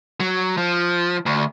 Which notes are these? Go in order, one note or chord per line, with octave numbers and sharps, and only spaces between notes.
F#3
F3
D2